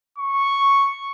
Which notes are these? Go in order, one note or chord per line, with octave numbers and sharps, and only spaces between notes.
C#6